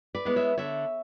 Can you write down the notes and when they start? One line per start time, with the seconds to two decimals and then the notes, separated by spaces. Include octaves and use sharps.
0.15 B4 D5
0.25 G#3 B3 E4
0.36 C#5 E5
0.58 D3 C#5 E5